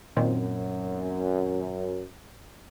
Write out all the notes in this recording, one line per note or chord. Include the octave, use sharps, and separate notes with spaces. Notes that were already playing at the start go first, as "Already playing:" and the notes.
F#2 A#2 D#3 C4